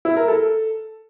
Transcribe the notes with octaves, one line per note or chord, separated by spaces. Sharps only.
E4
A#4
A4